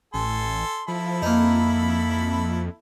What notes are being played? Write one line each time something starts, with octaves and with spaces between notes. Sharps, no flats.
A1 A4 G#5 C6
F3 E4 A4 B5
F2 A#3 D#4